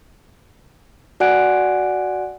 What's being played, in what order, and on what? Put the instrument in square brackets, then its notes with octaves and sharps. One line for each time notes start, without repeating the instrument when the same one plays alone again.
[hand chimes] F#4 D5 F#5 G#5 F#6 D7